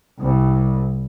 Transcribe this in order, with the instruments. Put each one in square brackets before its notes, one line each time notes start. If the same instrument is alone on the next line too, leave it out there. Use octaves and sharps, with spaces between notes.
[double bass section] C2